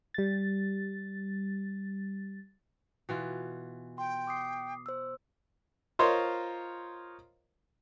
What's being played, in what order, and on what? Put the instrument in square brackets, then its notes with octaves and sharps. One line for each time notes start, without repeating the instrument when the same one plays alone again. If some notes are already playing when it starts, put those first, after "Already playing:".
[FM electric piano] G3 A6
[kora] B2 E3 F4
[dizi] G5 [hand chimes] C6
[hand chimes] D6 D#6 C7
C5 E6
[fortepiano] F4 A#4 C5 C#5 D#5